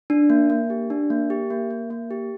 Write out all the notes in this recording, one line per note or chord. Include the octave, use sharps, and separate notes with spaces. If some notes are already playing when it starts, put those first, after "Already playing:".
D4
A#3
A#3
G4
D4
A#3
G4
A#3
A#3
A#3
G4